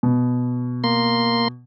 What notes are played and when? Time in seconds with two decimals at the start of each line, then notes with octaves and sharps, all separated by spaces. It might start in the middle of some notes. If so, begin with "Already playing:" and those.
0.03 B2
0.84 A#3 C6